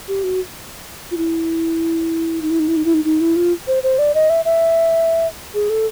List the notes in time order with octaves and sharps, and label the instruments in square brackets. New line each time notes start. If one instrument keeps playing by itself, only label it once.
[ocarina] G4
F#4
F4
E4
D#4
E4
D#4
E4
D#4
E4
D#4
D#4
E4
F4
C5
C5
D5
D#5
E5
E5
G#4
A4